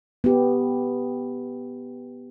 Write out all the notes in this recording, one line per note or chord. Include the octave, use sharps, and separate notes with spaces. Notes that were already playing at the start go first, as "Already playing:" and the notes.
B3 G4